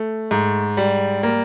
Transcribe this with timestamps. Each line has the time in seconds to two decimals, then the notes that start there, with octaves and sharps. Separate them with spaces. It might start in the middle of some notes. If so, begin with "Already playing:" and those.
Already playing: A3
0.31 G#2
0.77 G3
1.23 A#3